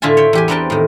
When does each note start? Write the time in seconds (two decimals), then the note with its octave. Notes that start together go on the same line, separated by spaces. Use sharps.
0.02 A2 D3 F4 E5 G#5 A5
0.17 C#5 E5 G5
0.33 E2 G4 G#5
0.48 B3 C4 D4 A#4 G5 A5
0.70 A2 D#3